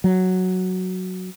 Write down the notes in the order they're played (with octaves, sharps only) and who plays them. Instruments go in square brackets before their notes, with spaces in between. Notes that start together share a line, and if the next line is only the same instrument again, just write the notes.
[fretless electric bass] F#3